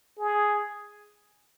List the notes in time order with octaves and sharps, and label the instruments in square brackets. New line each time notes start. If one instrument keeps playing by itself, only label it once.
[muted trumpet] G#4